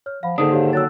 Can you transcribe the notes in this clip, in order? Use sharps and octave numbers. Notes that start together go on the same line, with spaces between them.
C#5 F6
F3 F5 F#5 B5
D#2 G#2 D3 D#3 D4 D#6
G4 C#5 F5
F#3 E6 F#6 A6